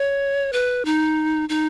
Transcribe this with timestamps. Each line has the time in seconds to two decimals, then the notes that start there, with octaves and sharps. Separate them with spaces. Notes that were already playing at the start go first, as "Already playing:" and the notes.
Already playing: C#5
0.53 B4
0.85 D#4
1.49 D#4